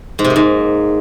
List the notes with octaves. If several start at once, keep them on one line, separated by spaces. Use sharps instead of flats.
G#2
C3
A#3
G#2